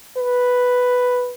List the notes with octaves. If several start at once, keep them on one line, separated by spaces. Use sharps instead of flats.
B4